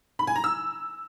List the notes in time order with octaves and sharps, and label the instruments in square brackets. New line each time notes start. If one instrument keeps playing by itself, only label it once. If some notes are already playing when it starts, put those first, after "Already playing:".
[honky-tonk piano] B5
G#5
A#5
E6